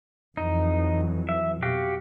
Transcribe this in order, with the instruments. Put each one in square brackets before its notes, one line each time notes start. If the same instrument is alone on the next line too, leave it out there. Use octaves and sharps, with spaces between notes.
[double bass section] F2 E3 F#3 [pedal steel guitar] D#4
[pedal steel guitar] E5
[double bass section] B2 [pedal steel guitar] F#4 G4 F5